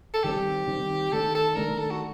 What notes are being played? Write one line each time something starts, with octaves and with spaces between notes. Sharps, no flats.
A4
D#3 G3 C4 G4
D#3 G3 C4
D#3 A3 D4 A4
A4
D#3 A3 D4 A#4
A4
F#4